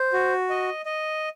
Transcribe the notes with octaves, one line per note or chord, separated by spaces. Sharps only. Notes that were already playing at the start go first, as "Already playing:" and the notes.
Already playing: C5
F#4
D#5
D#5